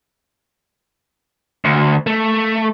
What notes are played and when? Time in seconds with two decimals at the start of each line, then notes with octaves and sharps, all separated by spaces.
1.65 D2
2.07 A3